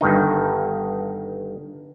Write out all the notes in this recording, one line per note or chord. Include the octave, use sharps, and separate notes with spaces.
G1 G2 D#3 D#4